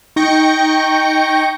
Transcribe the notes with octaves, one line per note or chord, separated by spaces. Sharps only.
D#4 G5 C#6 G6 A#6 C#7